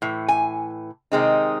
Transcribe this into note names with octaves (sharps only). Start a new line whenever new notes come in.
A2 E3
G#5
C3 D#3 G#3 C4 D#4